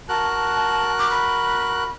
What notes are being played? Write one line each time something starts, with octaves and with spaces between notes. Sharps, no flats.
F#4 A#4 A5 F#6
D6
B5